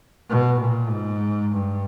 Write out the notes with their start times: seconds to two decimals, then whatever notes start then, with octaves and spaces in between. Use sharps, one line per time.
0.30 B2
0.61 A#2
0.90 G#2
1.52 G2